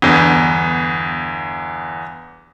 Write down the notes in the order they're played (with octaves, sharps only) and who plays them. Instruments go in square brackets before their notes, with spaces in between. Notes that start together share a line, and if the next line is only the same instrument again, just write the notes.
[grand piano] G1 E2